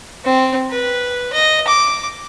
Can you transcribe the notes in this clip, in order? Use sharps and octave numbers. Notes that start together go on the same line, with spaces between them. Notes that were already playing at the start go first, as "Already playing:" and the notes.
C4
B4
D#5
D6